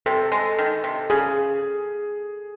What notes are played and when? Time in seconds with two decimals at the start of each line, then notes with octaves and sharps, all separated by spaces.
0.06 C3 A4
0.32 G#3
0.58 D#3
0.84 C3
1.10 C#3 G#4